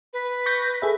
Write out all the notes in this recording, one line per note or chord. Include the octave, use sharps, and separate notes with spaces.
B4
C#6 G6 A#6
G#4 A4 E5